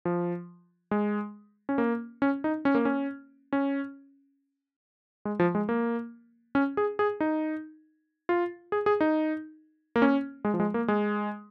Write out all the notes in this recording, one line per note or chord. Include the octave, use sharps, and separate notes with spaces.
F3
G#3
C#4
A#3
C#4
D#4
C#4
A#3
C#4
C#4
G#3
F3
G#3
A#3
C#4
G#4
G#4
D#4
F4
G#4
G#4
D#4
A#3
C#4
G#3
F3
G#3
A#3
G#3